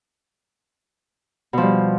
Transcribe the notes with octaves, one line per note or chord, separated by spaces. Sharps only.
B2 F3 G3